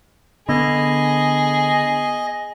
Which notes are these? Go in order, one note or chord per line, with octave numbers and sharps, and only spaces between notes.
D3 B3 G#4 D#5 B5